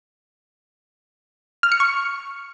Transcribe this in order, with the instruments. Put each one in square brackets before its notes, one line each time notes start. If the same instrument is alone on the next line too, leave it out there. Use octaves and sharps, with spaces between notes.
[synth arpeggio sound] F6
C#7
C#6